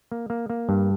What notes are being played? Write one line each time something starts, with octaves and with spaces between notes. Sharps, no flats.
A#3
A#3
A#3
G2